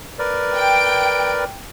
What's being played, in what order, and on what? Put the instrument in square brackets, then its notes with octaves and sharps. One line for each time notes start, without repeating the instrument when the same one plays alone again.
[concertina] A#4 B4 D5
[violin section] G5 D7